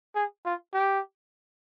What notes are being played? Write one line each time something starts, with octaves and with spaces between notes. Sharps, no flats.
G#4
F4
G4